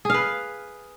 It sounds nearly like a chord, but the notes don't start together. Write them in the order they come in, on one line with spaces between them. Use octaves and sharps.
G#4 F5 B4